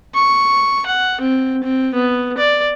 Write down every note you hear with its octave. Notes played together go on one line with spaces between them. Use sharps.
C#6
F#5
C4
C4
B3
D5